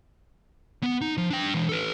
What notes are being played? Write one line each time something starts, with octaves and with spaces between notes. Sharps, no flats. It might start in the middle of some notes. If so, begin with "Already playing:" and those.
B3
D#4
F3
D4 G5
E3 G#3
A4 B4